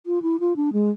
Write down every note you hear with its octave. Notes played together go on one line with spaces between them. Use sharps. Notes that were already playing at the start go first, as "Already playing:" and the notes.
F4
E4
F4
D4
G#3